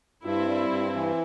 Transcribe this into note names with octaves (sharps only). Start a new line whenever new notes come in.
G2 C4 E4
G3
G2
E3